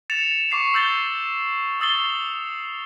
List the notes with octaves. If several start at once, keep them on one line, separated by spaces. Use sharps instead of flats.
A6 C#7 E7 F7
C#6 D6 C7 C#7 E7
E6 G6 A6 C7 G7
C#6 D#6 E6 A6 C7 G7